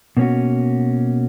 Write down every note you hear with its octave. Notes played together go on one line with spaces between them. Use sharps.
B2 A#3 C#4 F#4